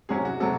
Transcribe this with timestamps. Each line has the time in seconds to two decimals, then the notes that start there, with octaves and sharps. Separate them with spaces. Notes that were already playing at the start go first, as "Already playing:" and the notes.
0.09 C3 F#3 C#4 G#4
0.25 F#4
0.40 C3 F#3 A4